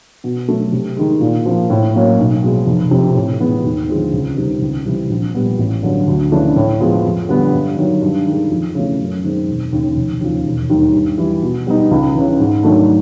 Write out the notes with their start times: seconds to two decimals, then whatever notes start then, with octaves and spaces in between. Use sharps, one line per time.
0.24 B2
0.48 F#3 A3
0.72 C3
0.97 D#3 G#3
1.21 A#2
1.46 F3 A#3
1.70 A2
1.94 F#3 A#3 C#4
2.19 B1
2.43 B2 G#3 C4
2.67 F1
2.91 F2 C3
3.15 A2
3.40 E3 G#3 B3 E4
3.65 D#2
3.89 D3 F3 G#3 C4
4.13 C#2
4.37 C3 D#3 G3 C4
4.61 C#2
4.86 C3 E3 G3 C4
5.09 A#1
5.35 A#2 G3 B3
5.58 A1
5.83 G2 D3 F#3
6.07 D2
6.31 C#3 E3 A3 D4
6.56 A2
6.80 F3 G#3 B3
7.04 F2
7.29 D3 G3 B3
7.53 G2
7.77 D#3 F#3
8.02 G2
8.26 D#3 G#3
8.50 F2
8.75 C#3 E3 A3
8.99 F#2
9.24 D#3 G#3 C4
9.47 E1
9.72 D#2 C#3
9.96 F1
10.21 D#2 C#3 F3
10.45 E1
10.70 D#2 D#3 G3
10.94 G2
11.18 E3 G3
11.42 B2
11.67 G3 B3 D#4
11.91 C#2
12.14 C#3 E3
12.40 G#2
12.63 D#3 F#3 A3 D4